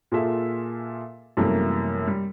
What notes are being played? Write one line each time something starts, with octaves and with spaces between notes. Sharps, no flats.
A#2 F4 G#4 A4 E5
F#2 C3 E3 G3 A3 A#3
G3